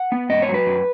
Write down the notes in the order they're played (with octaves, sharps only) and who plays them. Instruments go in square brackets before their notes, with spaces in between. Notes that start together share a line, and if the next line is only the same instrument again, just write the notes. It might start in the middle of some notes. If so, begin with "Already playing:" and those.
Already playing: [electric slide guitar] F#5
B3
G#2 D#5
C#5
F#3
B4
F#2